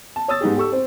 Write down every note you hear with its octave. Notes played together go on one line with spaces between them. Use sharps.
A5
C#5 D#6 E6 A6
G#2 B3 D#4 G4 G#4
G4 A4 C#6 E6
C4 C5